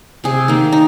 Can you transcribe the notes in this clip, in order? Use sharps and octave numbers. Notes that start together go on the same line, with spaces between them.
C3 G#4
D#3 A#3
D#4